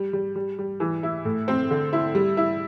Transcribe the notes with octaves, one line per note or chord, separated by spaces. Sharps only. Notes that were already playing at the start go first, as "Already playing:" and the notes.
Already playing: G3
G3
G3
G3
E3
E4
A2
C4
D3
E4
G3
E4